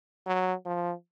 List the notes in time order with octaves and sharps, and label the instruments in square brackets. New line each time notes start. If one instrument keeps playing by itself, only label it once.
[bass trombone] F#3
F3